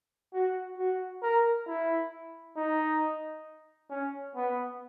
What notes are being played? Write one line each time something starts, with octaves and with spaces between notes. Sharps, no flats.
F#4
F#4
A#4
E4
D#4
C#4
B3